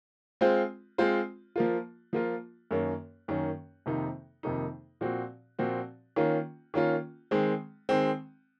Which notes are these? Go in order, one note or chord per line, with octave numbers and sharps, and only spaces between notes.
G#3 C4 F4 C5
G#3 C4 F4 C5
F3 A#3 F4
F3 A#3 F4
F#2 D#3 A#3 C#4
F#2 D#3 A#3 C#4
F2 C3 D#3 A#3 D#4
F2 C3 D#3 A#3 D#4
A#2 F3 C4 F#4
A#2 F3 C4 F#4
D#3 A#3 C#4 F4
D#3 A#3 C#4 F4
D#3 G#3 C4
D#3 G#3 C4